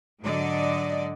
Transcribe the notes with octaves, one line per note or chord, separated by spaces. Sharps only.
G#2 D3 F#3 D5 D#5